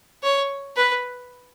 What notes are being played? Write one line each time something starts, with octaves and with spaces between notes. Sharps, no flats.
C#5
B4